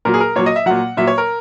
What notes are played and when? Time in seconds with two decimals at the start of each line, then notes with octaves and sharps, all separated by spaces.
0.05 A#2 F#3 A#4
0.14 G#4
0.20 A#4
0.36 A#2 F#3 C#5
0.46 D#5
0.56 E5
0.66 A#2 F#3 F#5
0.97 A#2 F#3 E5
1.07 C#5
1.18 A#4